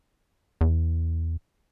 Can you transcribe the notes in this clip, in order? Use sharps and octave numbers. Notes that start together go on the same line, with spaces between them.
E2